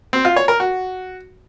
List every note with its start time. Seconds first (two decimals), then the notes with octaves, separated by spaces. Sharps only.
0.13 C4
0.25 F4
0.36 C#5
0.48 A#4
0.60 F#4